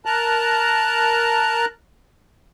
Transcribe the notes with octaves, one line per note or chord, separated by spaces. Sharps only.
A#4 A5 A#5 F#6